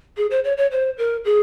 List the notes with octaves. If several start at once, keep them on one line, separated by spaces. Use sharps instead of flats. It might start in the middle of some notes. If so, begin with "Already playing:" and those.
G#4
C5
C#5
C#5
C5
A#4
G#4